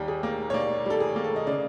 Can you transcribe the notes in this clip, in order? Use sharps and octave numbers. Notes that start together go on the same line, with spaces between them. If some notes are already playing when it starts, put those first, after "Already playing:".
Already playing: D#2 G3 G4
G#4
A#3
C#5
A#3 D5
G3 A4
G#4
A#3
A4
D#5
C#3 D5